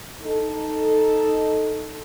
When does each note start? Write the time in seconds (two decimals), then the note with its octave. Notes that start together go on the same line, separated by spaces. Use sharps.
0.22 D#4 A4